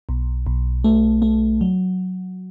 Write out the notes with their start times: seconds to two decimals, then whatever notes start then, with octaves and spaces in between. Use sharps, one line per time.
0.09 B1
0.46 B1
0.84 A3
1.22 A3
1.61 F#3